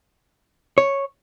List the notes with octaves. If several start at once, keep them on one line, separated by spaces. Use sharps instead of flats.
C#5